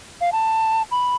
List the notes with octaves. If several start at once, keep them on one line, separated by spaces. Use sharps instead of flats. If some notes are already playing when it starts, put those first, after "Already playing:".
F5
A5
B5